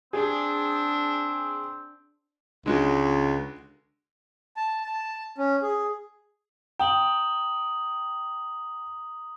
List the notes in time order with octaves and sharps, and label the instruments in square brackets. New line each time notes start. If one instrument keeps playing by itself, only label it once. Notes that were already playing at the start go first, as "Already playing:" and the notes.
[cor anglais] C4 [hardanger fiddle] D4 [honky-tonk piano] G#4
[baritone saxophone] C#2 [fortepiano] D3 G#3 F#4
[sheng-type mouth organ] A5
A5
C#4
G#4
[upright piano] G5 [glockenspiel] A#5 D#6 F#7